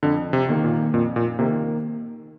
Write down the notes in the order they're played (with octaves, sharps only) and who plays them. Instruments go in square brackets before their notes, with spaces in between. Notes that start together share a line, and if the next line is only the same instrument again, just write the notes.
[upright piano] F2 [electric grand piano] D3
[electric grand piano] C3
[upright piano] D#3 A#3
[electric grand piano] A#2
[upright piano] F2 [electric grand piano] A#2
[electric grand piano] A#2
[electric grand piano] C3 [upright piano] D#3 A#3